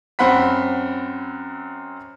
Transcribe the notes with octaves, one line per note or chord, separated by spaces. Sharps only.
F#2 C4 F#5 B5 B6